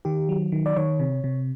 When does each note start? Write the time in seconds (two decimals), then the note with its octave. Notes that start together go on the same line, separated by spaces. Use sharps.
0.05 D#3 G4
0.29 F#3
0.52 D#3
0.66 D5
0.76 D#3 C#5
1.00 C3
1.24 C3